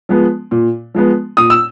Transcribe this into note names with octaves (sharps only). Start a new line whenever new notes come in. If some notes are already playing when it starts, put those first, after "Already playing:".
F3 G#3 B3
A#2
F3 G#3 B3
A#2 D#6
E6